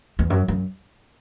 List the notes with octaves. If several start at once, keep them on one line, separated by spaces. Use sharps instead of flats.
E2
F#2
F#2